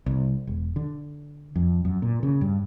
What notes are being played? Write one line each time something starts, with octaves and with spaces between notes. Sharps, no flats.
C2
E1
D3
F2
F#2
A#2
C#3
G2